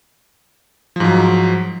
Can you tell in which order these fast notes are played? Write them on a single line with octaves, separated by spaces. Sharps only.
F3 G#2 F#3